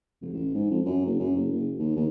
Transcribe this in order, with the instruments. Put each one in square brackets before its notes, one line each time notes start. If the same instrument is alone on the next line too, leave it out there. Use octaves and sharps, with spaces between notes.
[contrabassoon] F1
A1
G#2
F2
F#2
F#1
F#2
F#1
F#1
D#2
D#2